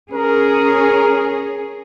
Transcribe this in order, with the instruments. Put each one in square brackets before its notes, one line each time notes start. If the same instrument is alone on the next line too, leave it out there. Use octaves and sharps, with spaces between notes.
[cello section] C#4 G#4 [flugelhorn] A#4